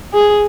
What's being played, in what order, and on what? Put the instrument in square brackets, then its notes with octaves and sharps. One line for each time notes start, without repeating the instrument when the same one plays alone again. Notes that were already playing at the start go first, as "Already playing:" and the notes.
[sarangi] G#4